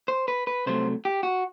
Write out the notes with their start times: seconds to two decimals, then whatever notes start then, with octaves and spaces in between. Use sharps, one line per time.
0.08 C5
0.28 B4
0.47 B4
0.66 C2 C3 F#3 A3 C5
1.05 G4
1.23 F#4